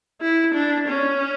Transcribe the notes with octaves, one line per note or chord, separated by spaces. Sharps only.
E4
D4
C#4